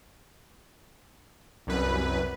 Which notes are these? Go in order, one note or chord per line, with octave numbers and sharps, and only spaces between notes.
C2 F#2 B4